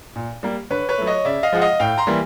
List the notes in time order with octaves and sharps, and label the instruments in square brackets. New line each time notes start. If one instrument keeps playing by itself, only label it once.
[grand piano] A#2
G3 A#3
D3 B4 C#5
B4 C#5
F#3 A3
C#5 D#5
C#3 D5 E5
D#5 F5
F3 G#3 F#5
D#5 F5
A2 F5 G5
A#5 C6
E3 G3 A#3